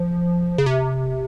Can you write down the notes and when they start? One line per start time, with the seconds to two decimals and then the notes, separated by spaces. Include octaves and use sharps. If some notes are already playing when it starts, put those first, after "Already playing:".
Already playing: F3
0.58 C#3
0.66 C3